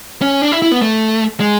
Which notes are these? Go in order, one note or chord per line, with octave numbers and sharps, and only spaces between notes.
C#4
D4
E4
E4
B3
A3
G#3